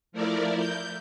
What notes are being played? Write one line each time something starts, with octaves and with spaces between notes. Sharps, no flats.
F3 A3 E4 A#4 D5
G6